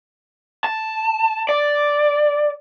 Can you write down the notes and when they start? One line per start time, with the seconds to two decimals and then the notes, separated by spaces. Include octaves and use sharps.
0.64 A5
1.49 D5